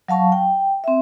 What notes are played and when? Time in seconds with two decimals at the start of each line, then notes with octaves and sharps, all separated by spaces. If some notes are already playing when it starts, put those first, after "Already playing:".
0.08 F#3 F5 A5 C#6
0.32 G5
0.84 C4 E5